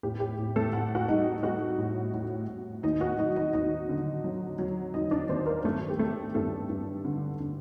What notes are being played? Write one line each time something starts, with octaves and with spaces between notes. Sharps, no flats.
A2 G4
G4
A2
A3 A4
A2 F#5
F#4 F#5
G3 D#4 D#5
G3 F#4 F#5
A2
A2
A2
D#2 D#4 D#5
F#4 F#5
F#3 D#4 D#5
D#4 D#5
D#2 D#4 D#5
D3
F#3
F#3
F#3 D#4 D#5
D4 D5
D#2 C4 C5
A#3 A#4
G2 A3 A4
G4
A3 A4
G2 A3 A4
G2
D3
D3